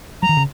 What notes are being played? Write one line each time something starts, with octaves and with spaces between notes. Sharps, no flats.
F#3 A#5
D#3
C#3